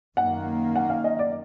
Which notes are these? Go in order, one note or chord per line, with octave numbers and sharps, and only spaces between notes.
F#2 D#3 A#3 F#5
F#5
F5
D#5
D5